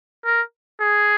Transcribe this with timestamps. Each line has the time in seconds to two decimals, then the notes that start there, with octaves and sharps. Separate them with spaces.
0.25 A#4
0.81 G#4